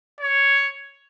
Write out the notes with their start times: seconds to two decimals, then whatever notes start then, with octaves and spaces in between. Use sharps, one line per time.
0.20 C#5